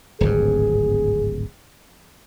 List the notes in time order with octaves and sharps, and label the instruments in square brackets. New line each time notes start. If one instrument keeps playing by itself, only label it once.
[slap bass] D1 G#1 G2 [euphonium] G#4